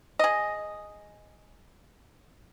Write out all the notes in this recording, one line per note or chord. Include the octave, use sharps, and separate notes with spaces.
G#4 D#5